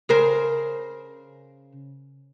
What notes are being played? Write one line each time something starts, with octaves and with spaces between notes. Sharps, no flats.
C#3 A#4 C5